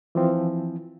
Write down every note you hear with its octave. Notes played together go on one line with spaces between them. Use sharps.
E3 F3 C4